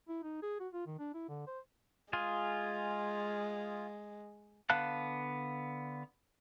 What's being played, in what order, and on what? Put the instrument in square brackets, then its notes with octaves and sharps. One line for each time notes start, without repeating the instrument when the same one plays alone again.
[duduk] E4
D#4
G#4
F#4
F4
D#3
D4
E4
D3
C5
[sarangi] G#3 [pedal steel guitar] F4 G#4
[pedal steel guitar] D3 B3 F5 A5 F#6